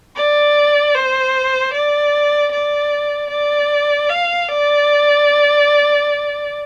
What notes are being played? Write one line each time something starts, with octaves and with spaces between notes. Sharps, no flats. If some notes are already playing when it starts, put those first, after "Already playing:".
D5
C5
D5
D5
D5
F5
D5